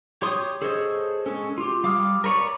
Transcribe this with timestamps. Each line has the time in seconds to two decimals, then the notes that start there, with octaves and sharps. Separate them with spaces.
0.22 G4 C#5 C6 D#6
0.62 G#4 A4 C5 C#5 D#5
1.26 G#3 C#4 A4
1.58 F4 G4
1.84 G3 F5 D6 D#6 F6
2.24 A#4 B4 C#5 D5 C#6